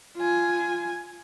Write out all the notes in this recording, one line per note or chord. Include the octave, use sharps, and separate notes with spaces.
F4 G#5